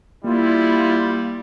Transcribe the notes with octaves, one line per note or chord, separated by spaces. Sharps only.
G3 A#3 E4 F4